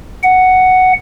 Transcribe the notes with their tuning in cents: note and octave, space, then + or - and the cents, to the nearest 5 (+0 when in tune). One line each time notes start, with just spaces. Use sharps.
F#5 +5